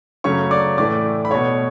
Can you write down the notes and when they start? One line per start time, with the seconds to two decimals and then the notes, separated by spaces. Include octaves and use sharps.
0.24 F#2 C#3 F#3 A3 C#5 C#6
0.51 D5 D6
0.77 A2 E3 A3 D5 D6
1.25 B5
1.31 B2 A3 C#5 C#6